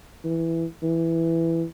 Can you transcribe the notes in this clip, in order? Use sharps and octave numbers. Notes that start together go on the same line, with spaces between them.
E3
E3